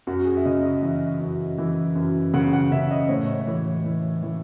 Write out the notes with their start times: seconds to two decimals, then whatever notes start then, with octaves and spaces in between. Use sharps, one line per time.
0.07 F#2 F#4
0.25 G#4
0.37 E5
0.45 C#3 D#5
0.63 D#5
0.82 E3 E5
1.20 F#2
1.58 E3
1.95 F#2
2.34 C#3 F#5
2.53 F#5
2.72 C#3 E5
2.91 D#5
3.09 A2 C#5
3.47 E3
3.85 E3
4.23 E3